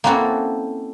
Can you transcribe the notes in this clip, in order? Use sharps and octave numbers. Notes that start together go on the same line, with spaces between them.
A#3 C4 C#4 E4 F#4 A4